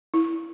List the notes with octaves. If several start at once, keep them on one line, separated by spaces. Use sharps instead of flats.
E4